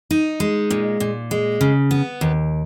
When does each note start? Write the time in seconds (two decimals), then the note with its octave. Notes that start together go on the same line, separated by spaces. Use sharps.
0.11 D#4
0.40 G#3
0.70 A#2
1.00 A#2
1.31 G#3
1.61 C#3
1.91 B3
2.21 D#2